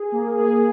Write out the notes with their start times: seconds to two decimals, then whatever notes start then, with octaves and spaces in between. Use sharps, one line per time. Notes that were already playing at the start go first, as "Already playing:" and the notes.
Already playing: G#4
0.12 A#3
0.38 G#4